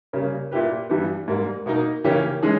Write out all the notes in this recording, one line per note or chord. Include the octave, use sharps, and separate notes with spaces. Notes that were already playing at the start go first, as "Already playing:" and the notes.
C#3 G3 A#3
A#2 A#3 E4 G4 B4
G2 E3 G3 B3
G#2 G3 A#3
B2 A#3 D#4
C#3 E3 A#3 C#4 G4
E3 G#3 C#4 G#4